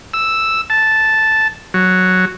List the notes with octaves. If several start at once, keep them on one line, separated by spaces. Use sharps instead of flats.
E6
A5
F#3